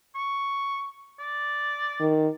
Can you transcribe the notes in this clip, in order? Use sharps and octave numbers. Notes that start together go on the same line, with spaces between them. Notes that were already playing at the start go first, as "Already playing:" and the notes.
C#6
D5
D#3